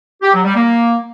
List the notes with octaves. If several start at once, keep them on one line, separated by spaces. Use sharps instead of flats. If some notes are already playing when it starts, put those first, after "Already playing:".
G4
F#3
G3
A#3